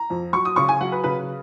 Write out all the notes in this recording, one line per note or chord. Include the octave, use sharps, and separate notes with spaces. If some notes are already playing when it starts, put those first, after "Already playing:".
Already playing: A#5
F2
F#3 C#6
D#6
C#3 C#6
G#5
F#3 F#5
B4
C#3 B4